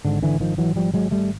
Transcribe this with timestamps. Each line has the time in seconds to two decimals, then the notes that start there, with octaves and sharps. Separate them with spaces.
0.05 G#1 G#2 D3
0.22 D3 E3
0.40 D#3 F3
0.58 E3 F#3
0.76 F3 G3
0.94 F#3 G#3
1.11 G3 A3